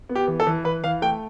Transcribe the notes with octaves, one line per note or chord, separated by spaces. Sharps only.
B3
G4
E3
A4
E3
E3 B4
E3 F5
A3 G5